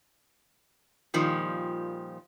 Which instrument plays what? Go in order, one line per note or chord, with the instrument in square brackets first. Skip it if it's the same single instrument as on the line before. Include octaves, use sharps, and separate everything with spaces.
[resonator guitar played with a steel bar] A#2 D#3 F3 G3